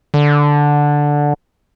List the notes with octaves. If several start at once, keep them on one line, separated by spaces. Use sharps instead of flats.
D3